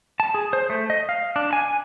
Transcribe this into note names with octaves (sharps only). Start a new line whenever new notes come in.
A5
G#4
C5
A3
D#5
F5
D4
G#5